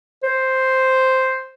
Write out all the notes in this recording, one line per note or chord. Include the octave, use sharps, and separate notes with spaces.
C5